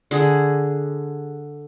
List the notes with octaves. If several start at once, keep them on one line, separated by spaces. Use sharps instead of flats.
D3 G#4